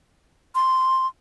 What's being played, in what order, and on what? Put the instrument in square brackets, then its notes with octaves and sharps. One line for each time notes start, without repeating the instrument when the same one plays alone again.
[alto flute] C6